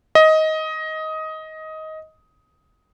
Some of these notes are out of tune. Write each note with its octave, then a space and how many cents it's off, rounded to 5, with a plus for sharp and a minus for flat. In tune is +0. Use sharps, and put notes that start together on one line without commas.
D#5 +15